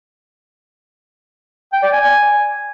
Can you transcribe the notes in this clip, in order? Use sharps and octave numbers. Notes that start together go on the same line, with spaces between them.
G5
D5
G#5